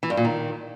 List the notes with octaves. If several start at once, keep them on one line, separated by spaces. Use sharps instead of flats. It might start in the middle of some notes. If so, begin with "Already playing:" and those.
E3
G2
A#2
D#3